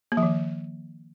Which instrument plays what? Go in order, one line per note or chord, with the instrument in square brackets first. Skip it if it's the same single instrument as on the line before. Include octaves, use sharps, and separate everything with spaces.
[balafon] A#3
F3
D#3